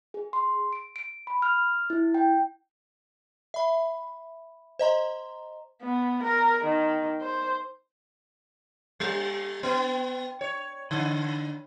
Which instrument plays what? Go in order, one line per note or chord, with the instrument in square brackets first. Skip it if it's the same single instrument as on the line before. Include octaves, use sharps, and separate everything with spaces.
[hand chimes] G#4
C6
D7
D7
B5
F6
E4
G5
[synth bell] E5 B5
C5 D#5 A#5 C6
[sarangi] B3
A#4
D#3
C5
[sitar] G3
B3
C#5
D3